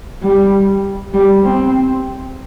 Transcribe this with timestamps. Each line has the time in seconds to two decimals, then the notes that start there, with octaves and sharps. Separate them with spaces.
0.23 G3
1.14 G3
1.44 C4